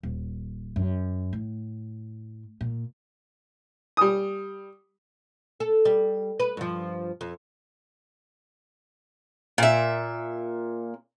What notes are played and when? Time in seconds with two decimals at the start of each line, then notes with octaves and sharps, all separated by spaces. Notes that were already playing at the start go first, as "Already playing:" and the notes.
0.03 D#1
0.76 F#2
1.33 A2
2.61 A#2
3.97 G3 D#6
5.60 A4
5.85 G3
6.40 B4
6.57 G2 F3
7.21 F2
9.58 A#2 E5